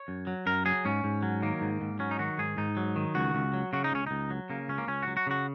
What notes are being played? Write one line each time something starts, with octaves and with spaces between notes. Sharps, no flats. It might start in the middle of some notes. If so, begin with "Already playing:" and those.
Already playing: C#5
F#2
F#3
F#2 A#4
F#3 G#4
G#2 C#4
G#2
F#3
D#3 A#3
G#2
G#2
F#3 C#4
D#4
D#3 F#4
G#2 G#4
G#2 D#4
F#3
D#3
C#2 F#4
C#2
F#3
C#3 F#4
D#4
C#2 C#4
C#2 D#4
F#3
C#3 A#3
C#2 C#4
A#3
C#2 C#4
F#3 F#4
F#4
C#3 F#4